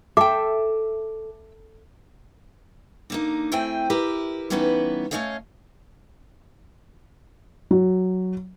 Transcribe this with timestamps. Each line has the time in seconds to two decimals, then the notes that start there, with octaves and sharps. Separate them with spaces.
0.17 A4 E5 G5 D6
3.10 D3 A#3 D#4
3.52 A3 C4 E4 C5 G5 G#5
3.90 E4 G4 A#4 B4
4.50 E3 G3 B3 C#4 D#4 B4
5.11 A3 A#3 C#4 C#5 D#5 F5
7.71 F#3